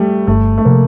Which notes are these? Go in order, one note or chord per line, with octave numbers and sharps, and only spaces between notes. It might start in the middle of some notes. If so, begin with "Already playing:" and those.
Already playing: G3 A3
G1 A3
A3
C3 F3 A#3